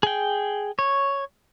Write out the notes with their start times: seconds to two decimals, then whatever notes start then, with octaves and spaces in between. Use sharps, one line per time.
0.03 G#4 G5
0.79 C#5